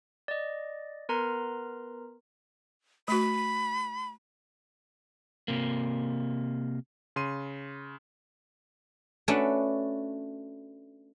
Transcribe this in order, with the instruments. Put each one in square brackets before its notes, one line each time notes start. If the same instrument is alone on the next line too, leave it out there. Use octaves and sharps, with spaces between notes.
[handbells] D5 D#5
B3 A#4 B4 A#5 C6
[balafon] A3 F#4 [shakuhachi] B5
[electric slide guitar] C3 A#3
[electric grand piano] C#3 C6 D#7
[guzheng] A3 C#4 D4 F#4 B4 E5